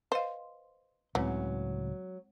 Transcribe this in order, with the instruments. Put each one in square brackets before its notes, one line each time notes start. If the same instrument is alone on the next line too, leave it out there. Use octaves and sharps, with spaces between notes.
[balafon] B4 D#5 F5 [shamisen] C5
[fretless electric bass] C#2 A2 C#3 [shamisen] E3 [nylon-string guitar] F#3 [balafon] G#3 C4